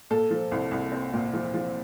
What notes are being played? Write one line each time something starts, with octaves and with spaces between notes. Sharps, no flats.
A#2 A4
F3
C2
C2
C4
A#2
F3
F3